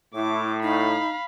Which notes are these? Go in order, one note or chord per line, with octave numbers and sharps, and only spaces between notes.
A2 E4 D6
D#4 F5 B5